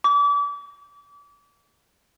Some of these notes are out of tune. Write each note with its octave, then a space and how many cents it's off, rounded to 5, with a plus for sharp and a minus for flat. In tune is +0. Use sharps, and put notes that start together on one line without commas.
D6 -35